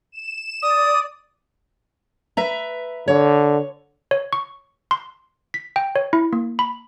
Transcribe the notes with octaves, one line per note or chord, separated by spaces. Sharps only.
E7
D5 D#6
B4 E5 A#5
D3 C#5
C#5
C#6
C6
B6
G5
C#5
E4
A#3
B5